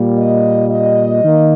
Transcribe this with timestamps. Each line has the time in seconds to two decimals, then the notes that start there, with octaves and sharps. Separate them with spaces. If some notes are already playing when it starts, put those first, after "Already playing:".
Already playing: A#2 G3 A#3
0.18 D#5
0.71 D#5
1.23 D#3 A#3